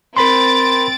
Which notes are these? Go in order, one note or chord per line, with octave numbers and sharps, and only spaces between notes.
C4 A#4 B5 C6 A6 D7